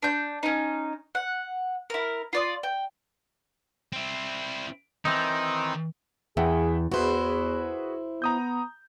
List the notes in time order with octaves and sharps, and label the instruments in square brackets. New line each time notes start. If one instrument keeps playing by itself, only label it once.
[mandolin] D4 G6
C#4 D#4
F#5
E4 A#4
F4 D5 D#6
G5
[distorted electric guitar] C4 E4
[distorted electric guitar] D#3 [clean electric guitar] E3 C4 D#4
[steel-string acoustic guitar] E2 [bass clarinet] G#4 [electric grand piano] E5 F#5 G5
[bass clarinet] E2 [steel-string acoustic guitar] E4 C5 [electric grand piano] F#4 G#4 B4
[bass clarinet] B3 [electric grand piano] A#5 D#6 G6